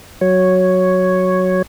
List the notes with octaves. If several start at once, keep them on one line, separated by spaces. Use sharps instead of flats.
F#3 C#5